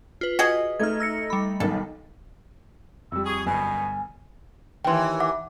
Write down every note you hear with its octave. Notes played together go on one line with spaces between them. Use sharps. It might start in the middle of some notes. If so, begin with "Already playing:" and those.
F4 B4
F#4 G#4 D#5
A3 D#4 F6 G#6
E6 A#6 C#7
G3 B5
B1 D#3 A4
F2 G3 E6
G#4 C#6
G1 F#2 B2 G#5
D#2 E3 G5 C6
E5 F#5 D6